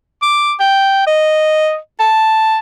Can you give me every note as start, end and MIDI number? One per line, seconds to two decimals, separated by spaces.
0.22 0.54 86
0.60 1.02 79
1.07 1.77 75
2.00 2.59 81